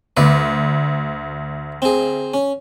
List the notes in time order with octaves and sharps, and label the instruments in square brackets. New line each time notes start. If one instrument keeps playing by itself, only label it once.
[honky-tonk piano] D2 [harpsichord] B4 D5
[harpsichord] C4 G#4
C#4